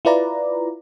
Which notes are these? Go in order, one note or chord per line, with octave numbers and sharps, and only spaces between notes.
E4 F4 B4 D5 A#5